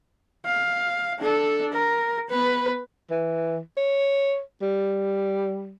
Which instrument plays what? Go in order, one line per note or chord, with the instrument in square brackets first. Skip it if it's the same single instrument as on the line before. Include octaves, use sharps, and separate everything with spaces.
[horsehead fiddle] F5
D4 A4
A#4
B3 B4
[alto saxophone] E3
C#5
G3